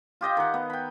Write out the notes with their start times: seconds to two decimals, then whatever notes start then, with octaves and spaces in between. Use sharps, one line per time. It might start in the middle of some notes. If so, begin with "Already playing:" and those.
0.21 F4 G4 D#5 G5
0.37 D#3 F#5
0.54 B3
0.70 G5 B5